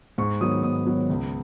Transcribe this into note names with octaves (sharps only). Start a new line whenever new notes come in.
G#2 C#6
D#3 F#3 B3 D#6
G#2 D#6
D#3 F#3 B3
C#2